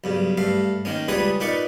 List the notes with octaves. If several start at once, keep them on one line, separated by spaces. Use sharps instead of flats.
B1 G2 C#3
G2 A3 F5
D#3 A#3 C#4
C#2 G3 G#4 B4 C#5 D#6
A#2 D#4 B4 D5 C#6